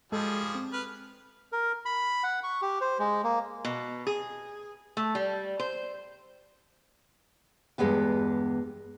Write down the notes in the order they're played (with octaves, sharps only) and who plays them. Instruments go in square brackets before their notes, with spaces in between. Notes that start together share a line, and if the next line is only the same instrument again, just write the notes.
[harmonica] F3 G3 G#4 [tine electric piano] G#3 A4
[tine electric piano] C4
[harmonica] B4 F6
[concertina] A#4
B5
F#5
C#6
G4
C5
G#3
A#3
[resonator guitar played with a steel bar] B2
G#4
A3
G3
C5
[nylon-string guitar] E2 G2 G#3 B3 G4